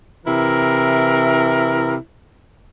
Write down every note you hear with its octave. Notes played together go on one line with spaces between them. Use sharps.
C3 E3 E4 A#4